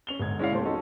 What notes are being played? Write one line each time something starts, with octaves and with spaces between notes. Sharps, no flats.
C#4 F7 G7
G1 G#2 G#6
G#3 C#4 E4 C#5 D5 F5
D#1 A3 C4 C6
F#3 C#4 D#4 A4